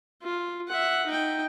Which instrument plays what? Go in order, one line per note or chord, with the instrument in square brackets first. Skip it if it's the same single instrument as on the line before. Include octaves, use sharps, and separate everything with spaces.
[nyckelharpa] F4
E5 F#5
D#4 G5